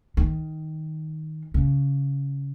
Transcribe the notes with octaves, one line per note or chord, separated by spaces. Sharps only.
D#3
C#3